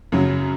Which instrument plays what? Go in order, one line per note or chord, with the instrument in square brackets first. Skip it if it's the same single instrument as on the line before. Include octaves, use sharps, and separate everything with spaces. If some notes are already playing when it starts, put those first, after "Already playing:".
[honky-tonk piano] F#2 C#3 F#3